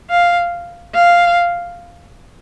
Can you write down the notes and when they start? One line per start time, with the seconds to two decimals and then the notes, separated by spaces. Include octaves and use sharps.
0.10 F5
0.95 F5